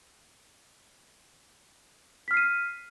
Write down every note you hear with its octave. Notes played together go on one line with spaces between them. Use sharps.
F6 B6 C7 D#7